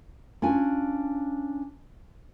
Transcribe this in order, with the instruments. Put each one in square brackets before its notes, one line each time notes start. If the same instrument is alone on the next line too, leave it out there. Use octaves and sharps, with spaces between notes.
[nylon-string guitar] C#4 D4 F4 G#5